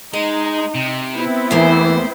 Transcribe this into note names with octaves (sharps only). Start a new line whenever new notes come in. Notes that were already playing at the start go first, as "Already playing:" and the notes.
G#3 D#4 D#5
C3
B3 C4 E4
E2 E3 A3 A#3 C5